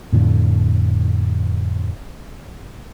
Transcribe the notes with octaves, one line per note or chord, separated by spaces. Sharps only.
F2 A2 D3 F3